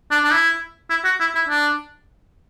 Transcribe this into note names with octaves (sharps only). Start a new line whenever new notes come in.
D4
D4
E4
E4
F#4
E4
E4
D4